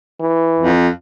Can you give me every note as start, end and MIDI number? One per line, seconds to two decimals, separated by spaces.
0.20 0.71 52
0.60 0.88 41